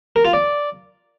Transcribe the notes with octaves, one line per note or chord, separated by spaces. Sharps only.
A#4
F4
D5